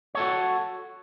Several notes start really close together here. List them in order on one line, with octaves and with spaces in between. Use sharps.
C#5 A4 F#4